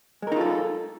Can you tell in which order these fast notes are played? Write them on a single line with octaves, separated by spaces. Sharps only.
G#3 A#4 D#4 F4 A4